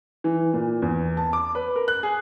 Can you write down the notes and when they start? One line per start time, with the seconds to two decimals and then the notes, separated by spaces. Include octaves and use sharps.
0.24 E3
0.53 A#2
0.82 E2
1.17 A5
1.33 D6
1.55 B4
1.76 A#4
1.88 F#6
2.03 G#4